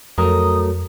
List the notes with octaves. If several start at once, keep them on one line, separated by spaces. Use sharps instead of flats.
F2 F#3 A3 A#4 D#6